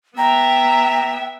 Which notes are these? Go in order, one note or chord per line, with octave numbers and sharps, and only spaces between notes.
B3 E5 G5 A#5